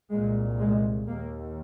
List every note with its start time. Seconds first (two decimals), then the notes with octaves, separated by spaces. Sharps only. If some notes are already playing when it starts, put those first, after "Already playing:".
0.11 C2 A#2 G#3
0.59 G#3
1.07 D#2 A#3